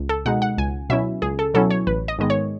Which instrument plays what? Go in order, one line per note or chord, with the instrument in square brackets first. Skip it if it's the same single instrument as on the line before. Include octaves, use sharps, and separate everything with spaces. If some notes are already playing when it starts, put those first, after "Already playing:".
Already playing: [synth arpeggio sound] C#2
A4
B2 G#3 D#4 F#5
F#5
C#2 G#5
B2 F#3 C#4 E4 E5
C#2 G#4
A4
B2 F#3 C#4 E4 A4
C#5
A1 B4
D#5
G#2 D#3 G#3 B3 D#5
C#5